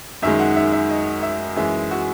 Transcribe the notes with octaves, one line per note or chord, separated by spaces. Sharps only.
F#2 D#3 G#3 E5
F#5
E5
E5
D#5
E5
F#2 E3 G#3 E5
F#4